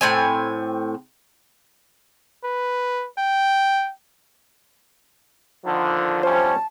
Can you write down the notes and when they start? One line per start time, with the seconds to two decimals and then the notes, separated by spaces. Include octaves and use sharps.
0.01 A2 C4 G#5
2.44 B4
3.18 G5
5.65 D3 D#3 F3
6.23 D2 G3 C#4 C5 A5